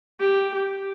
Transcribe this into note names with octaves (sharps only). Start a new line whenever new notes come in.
G4
G4